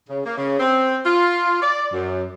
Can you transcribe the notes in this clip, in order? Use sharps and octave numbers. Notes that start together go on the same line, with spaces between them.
C#3
A#3
C#3
C4
F4
D5
F#2